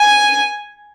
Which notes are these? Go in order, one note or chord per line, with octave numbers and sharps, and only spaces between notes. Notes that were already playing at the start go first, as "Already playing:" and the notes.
Already playing: G#5